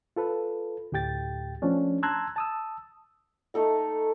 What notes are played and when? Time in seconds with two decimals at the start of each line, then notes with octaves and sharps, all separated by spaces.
0.16 F4 A4 B4
0.92 D2 A2 G4 G5 A6
1.62 F3 A3 C#4 D4
2.03 A5 A#5 C6 E6 F#6 G#6
2.36 A5 D#6 E6
3.54 A3 D#4 A4 A#5